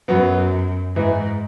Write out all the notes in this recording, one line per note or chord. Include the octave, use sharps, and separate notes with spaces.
F#2 F#3 B3
G#2 E3